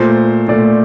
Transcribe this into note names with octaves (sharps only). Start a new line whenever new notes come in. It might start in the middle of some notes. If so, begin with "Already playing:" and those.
Already playing: A#2 A3 C5
A#2 A3 D5